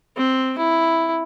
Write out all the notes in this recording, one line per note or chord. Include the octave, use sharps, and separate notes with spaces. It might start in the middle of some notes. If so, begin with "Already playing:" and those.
C4
E4